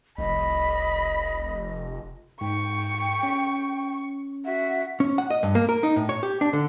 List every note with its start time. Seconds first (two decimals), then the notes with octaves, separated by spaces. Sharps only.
0.18 F1 C2 D#5 B5
2.41 G#2 G5 C#6
3.23 C#4
4.45 F#4 E5
5.00 C#4
5.18 F#5
5.30 D#5
5.43 G2
5.55 A#3
5.69 A#4
5.83 D#4
5.96 A2
6.09 C#5
6.23 G4
6.41 D4
6.53 D3